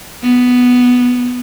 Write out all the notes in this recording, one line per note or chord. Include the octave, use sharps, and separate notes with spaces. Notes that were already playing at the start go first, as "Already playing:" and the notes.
B3